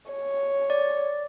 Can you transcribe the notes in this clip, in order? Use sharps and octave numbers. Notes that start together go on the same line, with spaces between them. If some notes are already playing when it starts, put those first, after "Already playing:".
C#5
D5